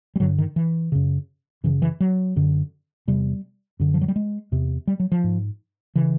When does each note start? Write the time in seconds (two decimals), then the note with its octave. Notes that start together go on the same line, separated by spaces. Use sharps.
0.16 G3
0.20 G2 D3 F#3
0.39 D#3
0.56 E3
0.92 F#2 C#3
1.64 F#2 C#3 E3
1.82 E3
2.00 F#3
2.36 F#2 D3
3.07 E2 C3 G3
3.80 F#2 D3
3.94 F3
4.01 F#3
4.08 G3
4.16 G#3
4.52 E2 C3
4.87 G3
5.00 F#3
5.12 F3
5.24 G#2
5.96 C#3 E3